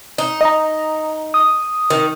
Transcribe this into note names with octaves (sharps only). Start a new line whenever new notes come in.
D#4
D#5 A#5
D#6
D#3